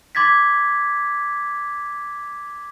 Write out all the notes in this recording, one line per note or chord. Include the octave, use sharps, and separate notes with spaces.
C6 D6 G#6 A6 B6